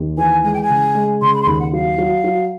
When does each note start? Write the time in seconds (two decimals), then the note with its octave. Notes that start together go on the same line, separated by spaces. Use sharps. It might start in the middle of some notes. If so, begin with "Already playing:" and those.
Already playing: D#2
0.18 E3 G#5
0.44 G#3 G#5
0.53 G5
0.62 G#5
0.69 C#3
0.95 G#3
1.21 C#3 C6
1.34 B5
1.41 C6
1.46 D#2 B5
1.59 F#5
1.73 F#3 F5
1.98 F#3
2.24 F#3